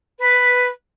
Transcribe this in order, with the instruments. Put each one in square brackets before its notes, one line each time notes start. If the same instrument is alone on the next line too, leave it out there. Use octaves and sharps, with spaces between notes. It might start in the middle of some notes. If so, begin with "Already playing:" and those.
[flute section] B4